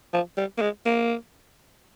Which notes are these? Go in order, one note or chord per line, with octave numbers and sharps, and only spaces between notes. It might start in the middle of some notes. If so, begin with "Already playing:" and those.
F3
G3
A#3
G#3
A#3